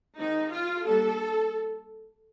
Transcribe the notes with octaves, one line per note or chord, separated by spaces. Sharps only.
D#3 G#3 C4 D#4
F4
G3 A#3 D4 A4